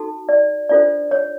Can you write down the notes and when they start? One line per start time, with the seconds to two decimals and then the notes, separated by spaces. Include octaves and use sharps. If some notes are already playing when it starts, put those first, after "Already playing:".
Already playing: D#4 F#4 A4
0.29 D5
0.69 D4 F4 A4 C5 D5
1.11 C#5